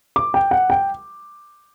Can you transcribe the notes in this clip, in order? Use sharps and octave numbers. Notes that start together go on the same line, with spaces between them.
D6
G5
F#5
G5